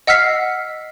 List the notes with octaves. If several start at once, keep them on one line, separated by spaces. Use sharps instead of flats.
D#5 F#5 E6 F6 B6 C7